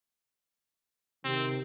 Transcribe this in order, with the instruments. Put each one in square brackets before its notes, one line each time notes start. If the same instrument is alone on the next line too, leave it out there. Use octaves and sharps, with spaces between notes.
[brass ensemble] C3 D#3 [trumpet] C4